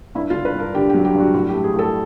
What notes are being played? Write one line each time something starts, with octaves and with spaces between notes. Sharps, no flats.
G2 E4
F4
D3
B4
G2 A#4
D3 G4
G4
F#3
G4
G2
F#4
A2 F#4
G4
A3
G#4
A2
A4